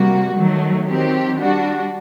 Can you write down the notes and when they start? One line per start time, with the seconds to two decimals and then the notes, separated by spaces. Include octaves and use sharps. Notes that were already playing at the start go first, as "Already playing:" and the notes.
Already playing: C3 G3 A#3 F#4
0.36 D#3 F#3 A3
0.88 D#3 F#3 C4 G4
1.39 G3 D4 F#4